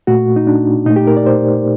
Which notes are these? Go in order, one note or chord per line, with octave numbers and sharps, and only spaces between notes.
A#2 A3 F#4
D#4
D4
A#2 A3 D#4
G4
A#4
D5
C5